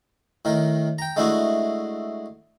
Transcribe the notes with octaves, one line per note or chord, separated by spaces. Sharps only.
A2 D#3 A#4
G5 A#5
G#3 A3 D4 E4 F#4 G#4